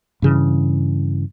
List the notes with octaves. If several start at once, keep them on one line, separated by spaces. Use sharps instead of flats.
G2 C#3 E3